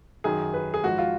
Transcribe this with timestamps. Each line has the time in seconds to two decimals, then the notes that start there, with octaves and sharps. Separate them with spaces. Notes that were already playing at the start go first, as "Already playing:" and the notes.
0.24 F#2 D#3 G#4
0.54 B4
0.74 G#4
0.83 G#2 F3 F#4
0.98 F4